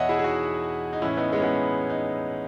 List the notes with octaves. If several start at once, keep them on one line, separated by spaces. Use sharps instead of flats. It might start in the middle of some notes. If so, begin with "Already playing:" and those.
Already playing: E2 B2 C#5 D#5 E5 F#5
E4 G#4
G#4
D#4 F#4
D#4
A2 E3 C#4 E4
B3 D#4
G#3 B3
C#4
G#3 B3
D#4